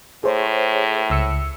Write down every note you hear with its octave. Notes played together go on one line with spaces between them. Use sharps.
A2 G#4 C5 C#5
C#2 E6 C#7